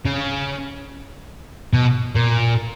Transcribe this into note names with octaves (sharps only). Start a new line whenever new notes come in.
C#3
B2
A#2